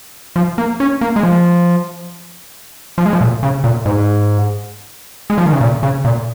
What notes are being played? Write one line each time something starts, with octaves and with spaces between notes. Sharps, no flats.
F3
A#3
C#4
A#3
G#3
F3
F3
G#3
F3
A#2
C#3
A#2
G#2
G#3
F3
D#3
C#3
A#2
C#3
A#2